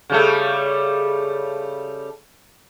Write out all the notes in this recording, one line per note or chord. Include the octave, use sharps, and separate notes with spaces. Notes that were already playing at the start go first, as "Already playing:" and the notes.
C#3 G3 A3